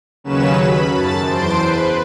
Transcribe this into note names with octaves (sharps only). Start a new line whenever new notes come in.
D#2 C#3 F#3 C#4 B4 E7
B5
F#2 A5 A6
E2 C5 C6 D7
B4